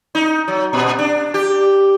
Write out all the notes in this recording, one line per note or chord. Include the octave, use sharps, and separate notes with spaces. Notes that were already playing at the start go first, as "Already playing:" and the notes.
D#4
F#3
A#2
D4
G4